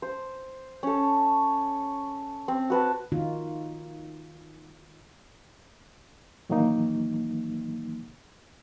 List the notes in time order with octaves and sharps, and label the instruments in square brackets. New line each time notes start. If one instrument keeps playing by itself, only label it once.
[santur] C5
C#4 A4
C4
F#4 B4 A5
[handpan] D#3 D#4 F4 F#4
[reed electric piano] A2 D#3 E3 F#3 A#3 D#4